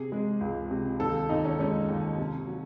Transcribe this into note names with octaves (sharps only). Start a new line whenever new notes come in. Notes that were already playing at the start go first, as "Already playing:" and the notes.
Already playing: C3 G#4
G#3
C#2
C3
D#2 A4
D#2 D#4
C#4
G#3 C#4
D#2
C3
F#3